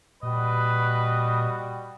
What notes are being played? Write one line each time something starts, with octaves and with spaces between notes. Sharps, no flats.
A#2 G3 F#4 B4 D#5